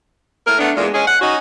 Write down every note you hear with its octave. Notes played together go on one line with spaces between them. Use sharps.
A2 A#4
A3 B3 D4
E2 A#2 G#3
G#3 C#4 G#4
F#5
C#4 D#4 F#4